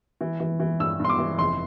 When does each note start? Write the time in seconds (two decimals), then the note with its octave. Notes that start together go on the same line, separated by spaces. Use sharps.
0.21 E3
0.40 E3
0.60 E3
0.80 G2 E6
1.00 G2
1.05 C6
1.09 D6
1.19 E3
1.38 F1 C6